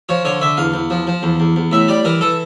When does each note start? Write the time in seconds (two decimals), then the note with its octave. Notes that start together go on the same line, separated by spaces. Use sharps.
0.09 F3 C#5
0.25 D3 C#5
0.41 D3 E5
0.57 E2 F5
0.74 E2
0.90 F3
1.07 F3
1.23 E2
1.40 E2
1.56 E2
1.72 A2 E5
1.88 G3 D5
2.05 E3 A#4
2.21 E3 A4